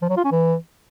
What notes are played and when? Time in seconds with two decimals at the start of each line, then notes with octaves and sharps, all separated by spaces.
0.02 F3
0.09 F#3
0.17 F4
0.24 C#4
0.32 E3